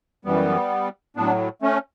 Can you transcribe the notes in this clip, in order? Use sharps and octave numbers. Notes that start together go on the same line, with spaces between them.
F#2 E3 G3 B3
A2 F#3 B3 D4
A3 C#4